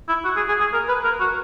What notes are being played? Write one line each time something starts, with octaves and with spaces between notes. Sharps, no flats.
E4
F#4
G#4
G#4
G#4
A#4
B4
A#4
F#4